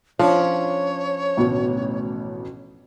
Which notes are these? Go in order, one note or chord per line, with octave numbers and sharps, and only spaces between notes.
F3 C#4 D4 C#5
A1 D2 B2